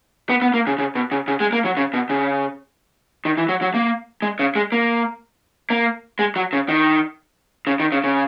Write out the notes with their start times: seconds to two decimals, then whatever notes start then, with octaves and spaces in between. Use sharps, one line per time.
0.30 B3
0.42 B3
0.54 A#3
0.67 C#3
0.79 C#3
0.95 B2
1.11 C#3
1.28 C#3
1.40 G#3
1.53 A#3
1.65 F#3
1.77 C#3
1.94 B2
2.10 C#3
3.25 D#3
3.37 E3
3.49 F#3
3.62 F#3
3.74 A#3
4.22 G#3
4.39 C#3
4.55 G#3
4.72 A#3
5.70 A#3
6.19 G#3
6.36 F#3
6.53 C#3
6.69 D#3
7.67 C#3
7.80 D#3
7.92 C#3
8.04 C#3